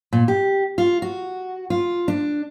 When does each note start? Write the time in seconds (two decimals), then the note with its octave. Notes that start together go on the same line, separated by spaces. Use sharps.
0.13 A#2
0.28 G4
0.78 F4
1.02 F#4
1.70 F4
2.08 D4